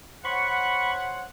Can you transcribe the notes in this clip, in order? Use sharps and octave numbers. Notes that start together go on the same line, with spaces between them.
C5 C#5 F#5 B5 C#6